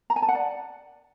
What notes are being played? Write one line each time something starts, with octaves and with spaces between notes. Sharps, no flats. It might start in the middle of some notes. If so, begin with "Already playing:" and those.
A#5
G#5
A5
F#5
D5